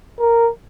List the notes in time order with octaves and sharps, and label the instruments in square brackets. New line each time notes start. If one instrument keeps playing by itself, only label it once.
[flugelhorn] A#4